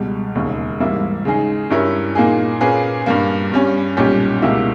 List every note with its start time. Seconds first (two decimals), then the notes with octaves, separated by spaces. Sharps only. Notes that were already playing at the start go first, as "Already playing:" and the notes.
Already playing: C#2 B2 G3
0.35 E1 D#2 C#3
0.80 G#2 E3 G3 A#3 E4
1.25 C#3 G#3 D#4 G#4
1.70 G2 G3 C#4 E4 A#4
2.15 A#2 A#3 D#4 G#4
2.61 A#2 A#3 C#4 G#4 B4
3.06 G2 G3 A#3
3.52 G2 G3 C#4
3.97 B1 A#2 G3 C#4 G4
4.42 C#2 B2 A#3 E4 G4